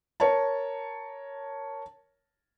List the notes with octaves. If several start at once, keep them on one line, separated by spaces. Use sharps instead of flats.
A#4 C#5 A5